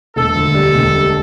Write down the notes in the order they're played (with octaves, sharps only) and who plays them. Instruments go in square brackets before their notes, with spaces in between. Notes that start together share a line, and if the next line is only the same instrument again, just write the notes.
[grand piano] E1 [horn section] A4
[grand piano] D2
G3
E1
G3